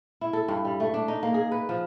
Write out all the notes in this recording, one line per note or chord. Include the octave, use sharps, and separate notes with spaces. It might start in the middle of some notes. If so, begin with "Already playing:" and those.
E4
A4
G2
G3
A3
D4
D#4
A#3
G#4
B4
F3